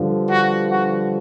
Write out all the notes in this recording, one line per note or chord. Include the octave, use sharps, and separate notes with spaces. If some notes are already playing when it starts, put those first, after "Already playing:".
Already playing: G2 D3 F3
F#4
F#4